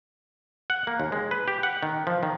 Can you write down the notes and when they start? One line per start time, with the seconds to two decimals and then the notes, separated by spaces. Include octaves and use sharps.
0.70 F#5
0.87 A#3
1.00 D#2
1.12 G#3
1.31 B4
1.48 G4
1.63 F#5
1.83 D#3
2.07 F3
2.23 D#3